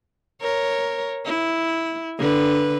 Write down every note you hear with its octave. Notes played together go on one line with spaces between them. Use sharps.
A#4 C#5
E4
D3 B4